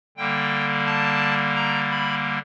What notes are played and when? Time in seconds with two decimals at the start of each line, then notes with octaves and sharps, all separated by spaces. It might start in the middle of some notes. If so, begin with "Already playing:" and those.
0.17 D3 G3 A#3 G5
0.86 A5
1.56 A#5
1.91 B5